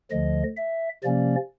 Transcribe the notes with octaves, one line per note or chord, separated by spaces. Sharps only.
D2 D3 F3 D#5
E5
C3 F3 A#3 C#4 D5